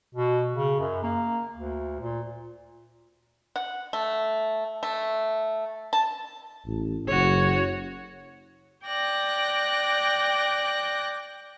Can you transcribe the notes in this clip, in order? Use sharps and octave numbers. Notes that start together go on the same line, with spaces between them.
B2
C#3
F#2
A#3
D2
A#2
F#5
A3
A3
A5
A1
F#1 F#4 C#5
D5 G5 F#6 A#6